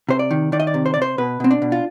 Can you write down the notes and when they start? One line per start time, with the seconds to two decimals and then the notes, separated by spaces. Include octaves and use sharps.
0.09 C3 C5
0.19 D5
0.31 D#3
0.52 D#3 D5
0.60 D#5
0.67 D5
0.74 C3
0.86 C5
0.94 C3 D5
1.02 C5
1.18 B2 B4
1.40 B2 C4
1.51 D4
1.62 B2
1.72 F4